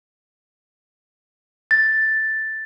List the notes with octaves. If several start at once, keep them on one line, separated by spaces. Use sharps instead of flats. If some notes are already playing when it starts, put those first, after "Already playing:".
A6